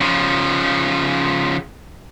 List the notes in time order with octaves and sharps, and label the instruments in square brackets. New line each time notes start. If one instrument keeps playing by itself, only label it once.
[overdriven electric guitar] C#3 F3